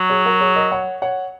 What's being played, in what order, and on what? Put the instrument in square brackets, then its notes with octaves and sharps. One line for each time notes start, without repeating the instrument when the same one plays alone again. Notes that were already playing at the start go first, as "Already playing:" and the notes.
Already playing: [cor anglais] F#3
[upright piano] G#4 C#5
F#4 A#4
G#4 C#5
A#4 D#5
C#5 F#5
C#5 F#5